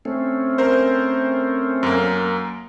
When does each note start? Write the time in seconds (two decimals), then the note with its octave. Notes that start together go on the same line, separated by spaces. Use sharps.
0.05 A3 C4 C#4
0.58 A#4 C5
1.83 F#2 A#3